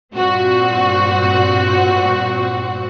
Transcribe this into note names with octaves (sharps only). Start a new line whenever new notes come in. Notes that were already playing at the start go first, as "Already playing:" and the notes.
G2 A#2 C4 F#4